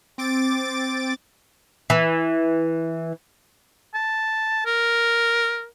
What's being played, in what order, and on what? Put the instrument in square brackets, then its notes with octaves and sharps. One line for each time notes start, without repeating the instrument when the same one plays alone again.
[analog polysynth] C4 D6 A6
[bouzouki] E3
[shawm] A5
A#4